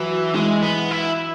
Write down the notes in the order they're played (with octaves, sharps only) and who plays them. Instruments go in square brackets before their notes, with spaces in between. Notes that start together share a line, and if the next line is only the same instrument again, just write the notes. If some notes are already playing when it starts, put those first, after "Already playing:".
Already playing: [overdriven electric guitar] E3 [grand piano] F#3
[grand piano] E3 [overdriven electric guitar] G#3
[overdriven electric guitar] B3
E4